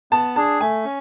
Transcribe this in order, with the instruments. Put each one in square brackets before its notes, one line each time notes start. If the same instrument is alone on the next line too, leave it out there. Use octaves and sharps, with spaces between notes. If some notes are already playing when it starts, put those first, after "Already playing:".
[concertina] B3 [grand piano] A5
[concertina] D4 G#4 [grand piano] A5
[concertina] A3 [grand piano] G#5
[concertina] C#4